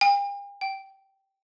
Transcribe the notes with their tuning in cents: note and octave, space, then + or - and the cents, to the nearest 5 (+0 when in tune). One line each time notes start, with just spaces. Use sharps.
G5 +45
G5 -15